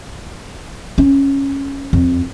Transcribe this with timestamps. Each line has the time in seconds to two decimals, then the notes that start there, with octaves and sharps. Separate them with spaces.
0.98 C#4
1.93 F2